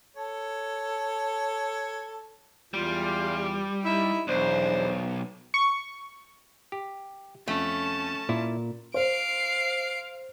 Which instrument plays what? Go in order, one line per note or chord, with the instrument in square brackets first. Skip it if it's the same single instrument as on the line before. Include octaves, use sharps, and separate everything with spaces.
[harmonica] A4 C#5
[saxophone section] E2 F4 [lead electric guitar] G3
[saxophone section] D#4 E4 E5
[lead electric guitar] B1 [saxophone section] E2 D4 C5
[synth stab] C#6
[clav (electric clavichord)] G4
[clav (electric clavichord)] F2 [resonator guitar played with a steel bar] A3 [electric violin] C#4 A5
[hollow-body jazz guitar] A#2 [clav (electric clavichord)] E4
[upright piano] C5 [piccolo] F5 [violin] C7 D7